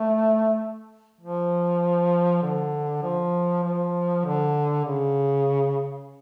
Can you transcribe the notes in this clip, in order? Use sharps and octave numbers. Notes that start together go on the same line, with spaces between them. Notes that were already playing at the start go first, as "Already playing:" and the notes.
Already playing: A3
F3
D3
F3
F3
D3
C#3